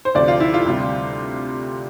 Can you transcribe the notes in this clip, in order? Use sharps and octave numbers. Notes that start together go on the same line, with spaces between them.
C5
D2 C3 F3 D5
F4
E4
F4
D2 C3 G3